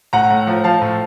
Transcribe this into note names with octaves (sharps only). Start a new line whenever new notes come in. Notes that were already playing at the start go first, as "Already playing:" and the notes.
A2 F#5 A#5
A2
F3
F3 F5 A5
A2